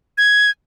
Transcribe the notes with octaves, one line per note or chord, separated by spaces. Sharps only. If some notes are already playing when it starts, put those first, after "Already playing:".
G#6